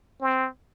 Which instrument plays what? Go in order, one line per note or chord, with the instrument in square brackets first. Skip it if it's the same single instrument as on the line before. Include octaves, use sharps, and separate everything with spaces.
[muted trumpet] C4